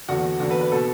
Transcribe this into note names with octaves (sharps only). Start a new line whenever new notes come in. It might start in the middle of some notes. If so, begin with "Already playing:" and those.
E2 D3 F#4
E2 D3 F#4
B4
B4
B2 A4